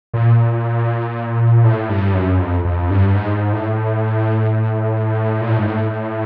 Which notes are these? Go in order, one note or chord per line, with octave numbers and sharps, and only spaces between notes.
A#2
A2
G2
F#2
F2
F2
G2
G#2
A2
A#2
A2
G#2
A2